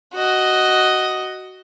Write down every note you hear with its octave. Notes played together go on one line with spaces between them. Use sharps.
F#4 D#5